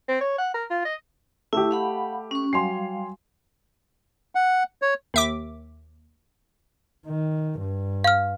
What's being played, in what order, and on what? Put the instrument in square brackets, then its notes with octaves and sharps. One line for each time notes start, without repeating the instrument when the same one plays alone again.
[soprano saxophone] C4
C#5
F#5
A#4
F4
D#5
[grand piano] A3 G4 [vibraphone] E4 E5
[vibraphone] F5 F#5 B5
C#4 C#6
[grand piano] F#3 G#5 C6 [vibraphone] G3 F5
[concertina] F#5
C#5
[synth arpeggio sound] D#2 E5 D6
[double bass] D#3
G2
[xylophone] F5 F6